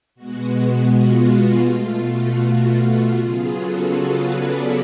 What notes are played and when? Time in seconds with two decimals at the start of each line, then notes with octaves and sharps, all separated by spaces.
0.15 B2 G#3 B3 F#4
0.53 F#4
0.91 F4
1.66 B2 A3
2.03 F#4
2.42 F#4
3.16 C#3 F#3 B3 F4 G#4
3.54 F#4 A4
3.91 G#4 B4
4.28 B4 D5